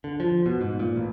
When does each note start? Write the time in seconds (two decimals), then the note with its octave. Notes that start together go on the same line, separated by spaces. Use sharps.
0.04 D3
0.20 F3
0.46 B2
0.61 G#2
0.79 A#2
0.96 A1